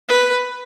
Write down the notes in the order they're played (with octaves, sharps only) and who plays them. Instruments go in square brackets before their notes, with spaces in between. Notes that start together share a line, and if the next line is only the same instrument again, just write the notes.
[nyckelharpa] B4